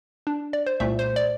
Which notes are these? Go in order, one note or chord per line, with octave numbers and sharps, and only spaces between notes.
D4
D5
C5
C2 A#2 A3 E5
C5
D5